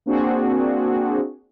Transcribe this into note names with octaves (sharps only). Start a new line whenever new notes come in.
A#3 C4 D4 F#4 G#4